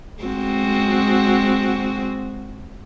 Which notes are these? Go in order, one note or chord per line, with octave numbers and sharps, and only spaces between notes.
G#3 C4 F#4